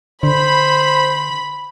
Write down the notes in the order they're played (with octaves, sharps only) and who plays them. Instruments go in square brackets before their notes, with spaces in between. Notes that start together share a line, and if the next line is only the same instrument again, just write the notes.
[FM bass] D3 [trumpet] C5 [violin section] B5